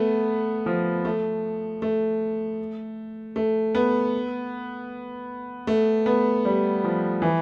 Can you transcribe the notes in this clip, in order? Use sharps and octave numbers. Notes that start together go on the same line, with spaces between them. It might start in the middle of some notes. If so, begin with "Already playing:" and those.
Already playing: A3 B3
F3
A3
A3
A3
B3
A3
B3
G3
F3
E3